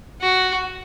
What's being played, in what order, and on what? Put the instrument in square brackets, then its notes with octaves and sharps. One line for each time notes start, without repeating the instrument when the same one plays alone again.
[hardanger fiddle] F#4